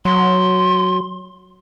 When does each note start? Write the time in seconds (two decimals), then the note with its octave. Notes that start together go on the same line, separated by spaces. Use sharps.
0.05 F#3 C6